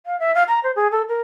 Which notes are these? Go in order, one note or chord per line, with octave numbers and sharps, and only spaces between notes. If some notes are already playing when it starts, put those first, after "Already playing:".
F5
E5
F5
A#5
C5
G#4
A4
A#4